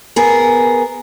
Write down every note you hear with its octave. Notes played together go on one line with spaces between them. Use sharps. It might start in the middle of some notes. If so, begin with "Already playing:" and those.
B3 G#4 A#4